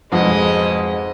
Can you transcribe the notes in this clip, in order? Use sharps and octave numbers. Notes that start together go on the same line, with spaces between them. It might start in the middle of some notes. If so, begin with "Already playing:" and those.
F2 G#2 B2 G#3 C5 D#5 F#5